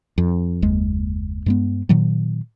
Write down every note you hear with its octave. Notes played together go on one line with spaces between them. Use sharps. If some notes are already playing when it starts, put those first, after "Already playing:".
F2
F#1 D#2 G#3
G2 G#3 B3
A#2 D#3 F#3